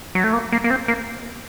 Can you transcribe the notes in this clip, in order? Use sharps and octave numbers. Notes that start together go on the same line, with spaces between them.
F#3
A3
A#3
A#3
A#3
C4
A#3